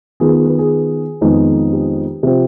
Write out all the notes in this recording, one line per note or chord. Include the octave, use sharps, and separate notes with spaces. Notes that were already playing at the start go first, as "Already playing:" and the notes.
D#3 B3 F4 G#4
G#4
B4
G#4
F2 D#3 G#3 B3 D#4
G4
C3 F3 C4 F4